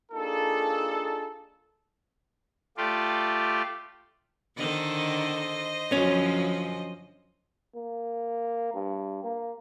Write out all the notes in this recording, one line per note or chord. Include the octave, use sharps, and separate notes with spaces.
A#3 D4 D#4 F4 G#4 A4
A3 F4 G4 D5
D3 D#3 A4 C5 D#5
F#2 D3 F3 C#4
A#3
G2
A#3